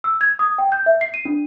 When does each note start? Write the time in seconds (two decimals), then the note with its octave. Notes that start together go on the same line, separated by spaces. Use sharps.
0.04 E6
0.21 G#6
0.39 D#6
0.58 G5
0.72 G6
0.86 E5
1.01 C7
1.14 D#7
1.25 D4